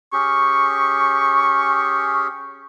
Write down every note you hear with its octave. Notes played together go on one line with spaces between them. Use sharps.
C#4 G4 G#4 C#6